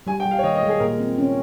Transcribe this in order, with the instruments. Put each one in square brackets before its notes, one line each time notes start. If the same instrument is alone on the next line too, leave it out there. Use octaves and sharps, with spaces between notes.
[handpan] G3 [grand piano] G#5
[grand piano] G5
[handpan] G3
[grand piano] F5
C#5
[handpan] D#3 [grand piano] D#5
[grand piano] D#5
[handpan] G#3
[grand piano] G#4
[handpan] A#2 [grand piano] A#4
[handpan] C4
C#4